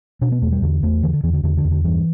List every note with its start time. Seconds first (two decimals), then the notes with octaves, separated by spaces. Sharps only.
0.21 B2 D4
0.32 B3
0.42 E2 A3
0.52 G3
0.62 E2 D3
0.83 E2 A3
1.03 D3 E3
1.13 D3
1.23 E2 E3
1.33 D3
1.43 E2 D3
1.57 D3
1.65 E2
1.71 D3
1.84 G2 E3